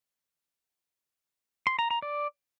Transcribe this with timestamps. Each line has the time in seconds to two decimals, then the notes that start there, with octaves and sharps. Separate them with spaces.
1.67 C6
1.79 A#5
1.91 A#5
2.02 D5